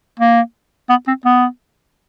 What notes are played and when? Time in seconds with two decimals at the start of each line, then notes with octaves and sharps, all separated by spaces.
0.19 A#3
0.89 B3
1.07 C4
1.25 B3